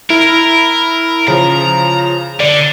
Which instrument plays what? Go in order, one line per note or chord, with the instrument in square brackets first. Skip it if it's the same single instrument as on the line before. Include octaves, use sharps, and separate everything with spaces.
[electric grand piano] E4 [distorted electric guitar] A#4
[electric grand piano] C#3 F3 [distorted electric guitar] A#5
[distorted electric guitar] D3 [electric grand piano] D5